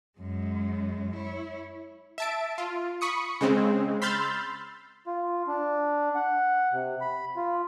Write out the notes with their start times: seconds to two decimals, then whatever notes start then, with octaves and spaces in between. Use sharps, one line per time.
0.19 F#2 G#3
1.16 E4 C#5
2.18 E5 A5 D7
2.58 F4
3.01 B5 C#6 D#6 C#7
3.41 C#3 G#3 C4
4.02 B5 C6 E6 F6 G6 A6
5.06 F4
5.48 D4
6.15 F#5
6.72 C3
7.01 B5
7.36 F4